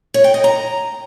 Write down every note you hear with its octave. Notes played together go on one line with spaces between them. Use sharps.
C#5
G5
D#5
A#5